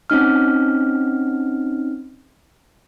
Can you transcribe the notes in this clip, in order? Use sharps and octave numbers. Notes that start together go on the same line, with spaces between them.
C4 C#4 D#4 F6